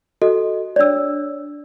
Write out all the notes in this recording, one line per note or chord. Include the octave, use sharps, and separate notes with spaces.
F#4 A4 D#5
D4 C#5 D5 E6